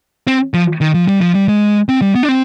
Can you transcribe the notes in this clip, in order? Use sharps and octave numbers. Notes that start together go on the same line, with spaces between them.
C4
F3
D#3
F3
G3
F3
G3
G#3
C4
G3
B3
D4
C4